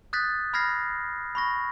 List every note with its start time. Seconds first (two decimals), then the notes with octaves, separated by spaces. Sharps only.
0.13 D#6 F#6 G6 A6 B6
0.53 B5 F6 G#6 A#6 C7
1.35 B5 C#6 A#6